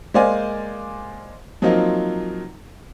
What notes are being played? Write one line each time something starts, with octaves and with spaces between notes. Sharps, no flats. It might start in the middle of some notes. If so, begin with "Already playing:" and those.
G#3 A#3 C5 D5 F5 G#5
F3 F#3 A#3 C4 D#4 F4